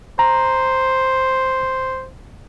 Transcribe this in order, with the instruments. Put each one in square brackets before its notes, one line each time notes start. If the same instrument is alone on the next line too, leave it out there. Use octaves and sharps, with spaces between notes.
[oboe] C5 [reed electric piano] A#5